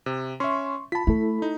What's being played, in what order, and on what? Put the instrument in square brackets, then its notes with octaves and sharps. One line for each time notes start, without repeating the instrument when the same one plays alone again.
[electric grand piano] C3
[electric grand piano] C#4 E5 [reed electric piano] C6 C#6
[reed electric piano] F4 A5 [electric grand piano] B5 B6
[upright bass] A3 [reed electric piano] E4 A4
[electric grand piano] D#4